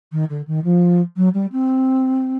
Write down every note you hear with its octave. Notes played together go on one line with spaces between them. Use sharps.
D#3
D3
D#3
F3
F#3
G3
C4